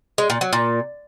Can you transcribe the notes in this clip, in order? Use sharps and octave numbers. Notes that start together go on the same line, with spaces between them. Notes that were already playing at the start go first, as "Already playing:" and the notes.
G#3
A#2
F#3
A#2